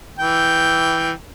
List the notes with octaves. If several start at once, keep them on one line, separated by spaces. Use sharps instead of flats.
E3 G5